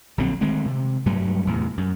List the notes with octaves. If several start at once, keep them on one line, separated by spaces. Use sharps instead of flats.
A#1 D3 F#3 C4
D#3 G#3 A3 C4
C3
G2 F#3 G3 A3
E2 A2 C3
F#2